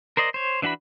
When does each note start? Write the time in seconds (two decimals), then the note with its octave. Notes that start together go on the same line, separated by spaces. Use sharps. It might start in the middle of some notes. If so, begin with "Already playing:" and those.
0.17 A#4 C5 D5 D#5
0.34 C5 C#5
0.62 E3 D4 F#4 E5 B5